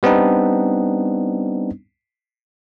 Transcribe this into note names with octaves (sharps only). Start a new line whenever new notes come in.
G3 B3 C4 D4 D#4